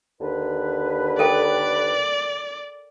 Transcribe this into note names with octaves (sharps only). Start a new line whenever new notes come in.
D#2 D3 B4
A4 A#4 D5 G5